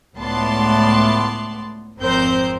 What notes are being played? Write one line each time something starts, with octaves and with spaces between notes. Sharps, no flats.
C#2 A2 B3 D5 A5 C6
G#1 F2 C4 A#4 C5 G6